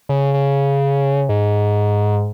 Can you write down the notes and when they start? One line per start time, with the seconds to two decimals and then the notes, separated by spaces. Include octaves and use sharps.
0.09 C#3
0.34 C#3
1.29 G#2